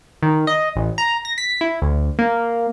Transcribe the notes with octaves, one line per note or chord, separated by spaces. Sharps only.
D#3
D#5
A1
A#5
A#6
B6
E4
D2
A#3